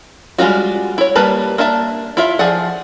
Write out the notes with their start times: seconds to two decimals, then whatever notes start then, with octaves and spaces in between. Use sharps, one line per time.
0.38 G3 G#3 D4 F4 F#4
0.98 E4 C#5
1.15 G3 A#3 B4 A5 B5
1.58 A#3 D4 E5 A5
2.17 E4 F4 E5
2.39 F3 G#4 D5 F#5